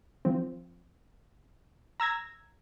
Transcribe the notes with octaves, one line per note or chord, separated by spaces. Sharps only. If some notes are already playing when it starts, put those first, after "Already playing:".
F3 C4
A#5 E6 G#6 A#6